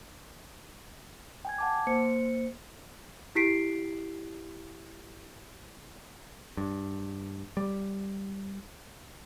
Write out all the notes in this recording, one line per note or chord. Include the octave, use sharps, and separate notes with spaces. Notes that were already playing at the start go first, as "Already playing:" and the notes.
G5 G#5 G#6
F#5 A5 D6
A#3 C5 C#7
E4 G4 B6 C7 D7
G2
G3